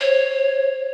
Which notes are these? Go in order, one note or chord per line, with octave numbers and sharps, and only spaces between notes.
C5 C#5